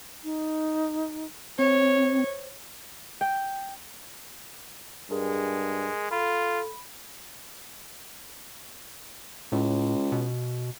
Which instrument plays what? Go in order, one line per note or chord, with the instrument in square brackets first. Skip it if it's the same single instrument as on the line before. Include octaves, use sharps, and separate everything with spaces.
[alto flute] D#4
[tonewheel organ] C4 [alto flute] C5 [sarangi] C#5
[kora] G5
[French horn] G2 [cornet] G#3 [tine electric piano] G#4 A#4
[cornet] F4 [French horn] A4 [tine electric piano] B5
[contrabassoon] C#2 [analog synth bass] A2
[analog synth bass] B2